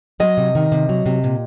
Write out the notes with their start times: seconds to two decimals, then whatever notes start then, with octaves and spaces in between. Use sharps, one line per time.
0.20 F#3 D#5
0.37 C3
0.55 D#3
0.72 C3
0.89 F#3
1.06 C3
1.24 A#2